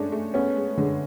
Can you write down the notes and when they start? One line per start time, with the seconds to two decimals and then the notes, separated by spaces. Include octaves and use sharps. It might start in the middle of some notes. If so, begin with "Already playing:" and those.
Already playing: G#3 A3 C#4 D4
0.12 A3
0.34 B3 C#4
0.56 G#3
0.77 D3 G#3